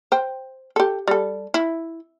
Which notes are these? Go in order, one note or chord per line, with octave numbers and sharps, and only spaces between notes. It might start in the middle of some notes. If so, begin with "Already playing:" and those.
C5 G5
G4 A4
G3 A4
E4